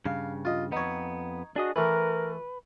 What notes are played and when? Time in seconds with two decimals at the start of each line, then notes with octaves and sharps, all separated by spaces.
0.06 G2 C#3 F5
0.45 F4 D#5
0.72 F2 B3 D#4 C#5
1.56 D4 F#4 G#4 D#5
1.76 E3 A3 A#4 B4